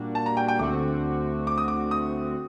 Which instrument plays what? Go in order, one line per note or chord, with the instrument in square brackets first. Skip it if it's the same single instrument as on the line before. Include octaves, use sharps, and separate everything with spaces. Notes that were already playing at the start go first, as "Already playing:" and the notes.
Already playing: [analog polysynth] A#2 G3 A#3 D4 F#4
[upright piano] A5
A#5
G5
G5
[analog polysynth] D2 D3 A3 C4 F#4 [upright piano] D6
[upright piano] D6
D#6
D6
D#6